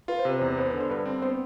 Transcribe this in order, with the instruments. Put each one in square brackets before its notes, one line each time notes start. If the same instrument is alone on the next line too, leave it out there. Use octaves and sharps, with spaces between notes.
[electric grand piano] F4 [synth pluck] B4
[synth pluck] C5
[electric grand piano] C3 [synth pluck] B4
[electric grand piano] E2 [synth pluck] C5
[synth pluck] B4
[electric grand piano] B3 [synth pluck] C5
[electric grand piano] D3 [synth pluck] B4
[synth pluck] C5
[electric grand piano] G2 [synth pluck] B4
[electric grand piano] C4
[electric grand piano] B3 [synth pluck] C5